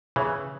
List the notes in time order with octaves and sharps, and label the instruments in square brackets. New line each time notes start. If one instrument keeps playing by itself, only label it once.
[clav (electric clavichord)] C#3 E3